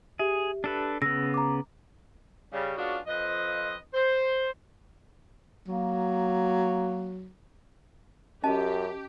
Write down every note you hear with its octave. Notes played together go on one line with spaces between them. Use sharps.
G4 G#4 E5
D4 A4 B4
C#3 B3 E6 A#6
A#5 D6
C#3 G3
G#3 B3 C#4 D4 F4 F#4
F2 F3 C4 B4 D#5
C5
F#3 A#3
F#2 C#4 G4 D#5 A5